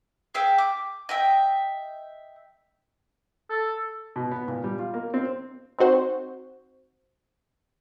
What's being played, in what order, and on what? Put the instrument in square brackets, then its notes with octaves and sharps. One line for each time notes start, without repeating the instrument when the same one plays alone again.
[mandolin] G#4 E5 F5 G5
D6
D#5 E5 G5
[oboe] A4
[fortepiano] B2
B3
A#2
G3
F4
A#3
C4
[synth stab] C4 D#4 F#4 C5